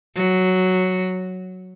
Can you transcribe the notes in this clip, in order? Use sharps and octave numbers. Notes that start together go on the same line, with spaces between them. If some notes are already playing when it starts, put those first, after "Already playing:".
F#3